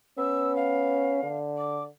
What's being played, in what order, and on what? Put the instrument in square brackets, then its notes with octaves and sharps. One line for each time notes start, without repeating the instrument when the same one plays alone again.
[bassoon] B3 [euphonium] C#4 [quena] E6
[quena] F5
[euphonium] D3
[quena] D6